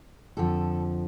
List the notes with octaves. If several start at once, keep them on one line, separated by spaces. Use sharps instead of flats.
F2 D3 F3 A4